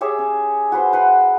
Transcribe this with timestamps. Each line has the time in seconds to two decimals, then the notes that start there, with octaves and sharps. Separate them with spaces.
0.01 G4 G#4 C#5 E5
0.19 C#4
0.72 F#4 B4 C5
0.93 A#4 B4 F#5 C6